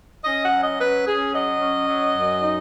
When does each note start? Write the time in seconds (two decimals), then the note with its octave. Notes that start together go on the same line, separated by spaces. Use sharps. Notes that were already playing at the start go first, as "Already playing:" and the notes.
0.24 C#4 D#5
0.42 F#5
0.51 F#3
0.60 D#5
0.79 C#4 B4
1.06 C#4 G#4
1.32 F#3 D#5
1.60 C#4
1.88 F#3
2.15 F#2
2.42 D#4